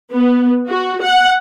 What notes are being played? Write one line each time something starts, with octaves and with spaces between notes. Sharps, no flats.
B3
F#4
F#5